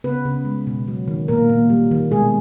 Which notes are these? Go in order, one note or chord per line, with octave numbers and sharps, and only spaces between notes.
C#3 B3 B4
C#3
G#3
B2
F#3
D#3
A#2 A#3 A#4
A#2
G3
D#3
B2 G#3 G#4